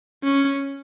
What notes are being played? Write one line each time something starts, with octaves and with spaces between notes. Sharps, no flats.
C#4